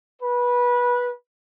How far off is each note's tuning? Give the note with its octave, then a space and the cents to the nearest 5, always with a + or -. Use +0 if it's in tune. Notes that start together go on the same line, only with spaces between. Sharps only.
B4 -20